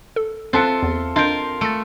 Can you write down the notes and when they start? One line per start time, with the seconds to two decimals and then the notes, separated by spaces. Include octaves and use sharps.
0.16 A4
0.53 C4 F4 A4 E5 F#6 C#7
0.83 E2
1.16 D4 F4 A#4 D#5 G6
1.61 A3 A6 C#7